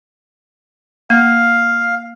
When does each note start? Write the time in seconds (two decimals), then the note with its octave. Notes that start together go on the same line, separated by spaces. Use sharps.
1.10 A#3 F5